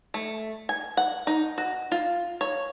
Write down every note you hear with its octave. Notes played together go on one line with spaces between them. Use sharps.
A3
G#5
F#5
D#4
F#4
F4
C#5